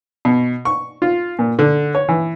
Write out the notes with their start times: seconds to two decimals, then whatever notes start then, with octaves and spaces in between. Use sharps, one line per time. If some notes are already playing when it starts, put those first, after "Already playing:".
0.25 B2
0.65 C#6
1.02 F4
1.39 A#2
1.59 D3
1.95 C#5
2.09 E3